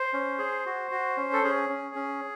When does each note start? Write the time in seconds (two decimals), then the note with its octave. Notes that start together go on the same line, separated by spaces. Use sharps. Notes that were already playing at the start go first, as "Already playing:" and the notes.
Already playing: C5
0.13 C#4
0.38 G#4
0.66 F#4
0.91 F#4
1.17 C#4
1.33 A4
1.44 C#4 G#4
1.69 C#4
1.95 C#4